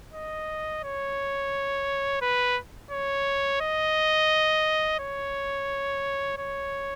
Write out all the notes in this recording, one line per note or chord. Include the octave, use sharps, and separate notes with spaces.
D#5
C#5
B4
C#5
D#5
C#5
C#5